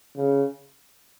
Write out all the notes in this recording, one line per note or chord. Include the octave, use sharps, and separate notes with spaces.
C#3